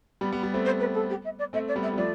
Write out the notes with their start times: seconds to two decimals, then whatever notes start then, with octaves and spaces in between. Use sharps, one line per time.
0.21 G3 B3
0.32 G3 B3
0.43 G3 B3
0.54 A3 C4
0.65 C5
0.80 B4
0.94 A4
1.10 G4
1.25 E5
1.39 D5
1.53 A3 C4 E5
1.68 D5
1.76 G3 B3
1.83 E5
1.94 G3
1.97 F3 A3 D5